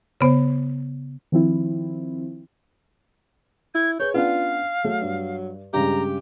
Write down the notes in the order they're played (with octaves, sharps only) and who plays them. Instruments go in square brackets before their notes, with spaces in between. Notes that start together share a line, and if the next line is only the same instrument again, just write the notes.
[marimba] C#3 B3 C5
[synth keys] D#3 F3 C4 E4
[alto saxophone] E4 [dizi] G#6
[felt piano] G#4 B4 [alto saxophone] C#5 [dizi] G6
[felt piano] B3 C#4 D4 [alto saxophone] F4 [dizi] F5
[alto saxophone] F#3 [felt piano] A3
[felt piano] G2
[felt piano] G2 C#3 G#3 [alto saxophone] G4 [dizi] A#5